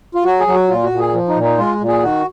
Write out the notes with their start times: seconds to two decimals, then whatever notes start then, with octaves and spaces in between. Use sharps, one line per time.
0.15 F4
0.24 F#3 F#4
0.40 G#4
0.47 F#3
0.54 F#4
0.69 A#2 F4
0.84 F#4
0.91 A#2
0.99 G#4
1.14 F3
1.29 D#4
1.36 A#2
1.43 D#4
1.58 G#3 F4
1.81 A#2
1.88 G#4
2.03 D#3 F#4